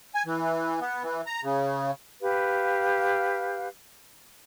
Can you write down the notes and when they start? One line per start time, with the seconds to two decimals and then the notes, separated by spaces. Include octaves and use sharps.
0.14 G#5
0.26 E3
0.81 B3
1.03 E3
1.26 A#5
1.44 C#3
2.21 G4 B4 F5